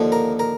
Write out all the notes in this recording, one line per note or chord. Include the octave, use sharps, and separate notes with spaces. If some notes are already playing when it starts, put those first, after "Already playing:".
Already playing: D#2 D3 F3
A#4
A#4